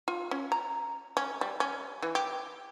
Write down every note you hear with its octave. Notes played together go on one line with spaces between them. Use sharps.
F4
C#4
A#5
C#4
G3
C#4
E3
G4